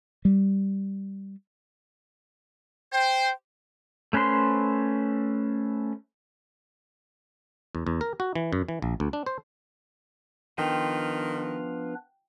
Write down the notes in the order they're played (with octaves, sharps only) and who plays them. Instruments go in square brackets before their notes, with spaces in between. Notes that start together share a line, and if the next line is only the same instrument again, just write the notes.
[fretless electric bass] G3
[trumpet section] C5 [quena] G5
[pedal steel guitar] A3 C#4 B4 C5 C6
[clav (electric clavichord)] E2
E2
A#4
F#4
E3
F#2
E3
A#1
D2
D4
C5
[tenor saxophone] D#3 [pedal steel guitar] F3 F4 [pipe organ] B3 D4 B4 [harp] G5